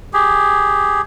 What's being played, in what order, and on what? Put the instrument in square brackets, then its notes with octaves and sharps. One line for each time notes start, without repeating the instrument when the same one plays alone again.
[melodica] G4 G#4